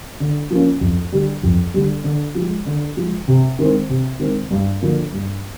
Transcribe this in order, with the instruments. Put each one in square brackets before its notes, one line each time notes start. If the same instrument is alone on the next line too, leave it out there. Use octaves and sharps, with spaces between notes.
[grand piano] D3
F3 A#3 C#4
F2
D3 G3
F2
D3 G3
D3
F3
G#3
D3
F3 G#3
C3
D#3 G#3 C4
C3
D#3 G#3 C4
G2
D3 F3 A#3
G2